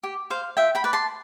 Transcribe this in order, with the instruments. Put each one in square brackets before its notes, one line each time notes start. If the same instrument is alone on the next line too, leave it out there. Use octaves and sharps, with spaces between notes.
[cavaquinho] G4
C5 F5
F4 E5 G5
G5 B5
B4 D5
A5 C6